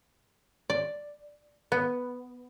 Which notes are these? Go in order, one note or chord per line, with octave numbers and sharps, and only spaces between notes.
D5
B3